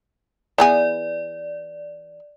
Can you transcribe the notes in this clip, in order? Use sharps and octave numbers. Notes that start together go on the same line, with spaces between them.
E3 B3 G#4 D5